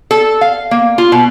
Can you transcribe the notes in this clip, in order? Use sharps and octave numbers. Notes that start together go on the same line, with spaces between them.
A4
F5
A#3
F4
B2